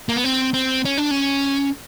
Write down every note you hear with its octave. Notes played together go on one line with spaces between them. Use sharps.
A#3
B3
C4
C4
C#4
D4
C#4